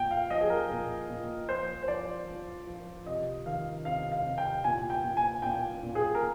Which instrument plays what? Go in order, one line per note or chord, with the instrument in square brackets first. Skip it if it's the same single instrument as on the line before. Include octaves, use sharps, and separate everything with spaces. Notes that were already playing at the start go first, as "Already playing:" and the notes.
Already playing: [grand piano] A#2 G5
F5
F3 D#5
G#4
A#4
A#2
A#2
F3 C5
C5
F3 D5
F3
F3
C3 D#5
D#3 F5
C3 F5
F5
C3
G5
A#2 G#5
G5
A#2
G#5
A#2 G5
A#2
G#4
A#4